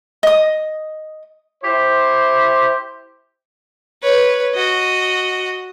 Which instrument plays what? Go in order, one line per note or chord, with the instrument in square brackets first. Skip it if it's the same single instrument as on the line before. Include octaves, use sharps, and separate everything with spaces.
[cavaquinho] D#5 D#6
[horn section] E4 G4 C5
[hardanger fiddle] B4 C#5
F#4 D#5